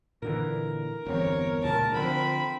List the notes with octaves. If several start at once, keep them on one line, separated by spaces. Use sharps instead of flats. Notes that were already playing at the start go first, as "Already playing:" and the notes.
A#2 D3 E3 A#4
G1 E2 C4 C#5
C#2 A#2 A5
D3 E3 F3 C4 B5